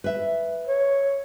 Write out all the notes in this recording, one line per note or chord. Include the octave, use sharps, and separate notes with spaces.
B4 E5
C#5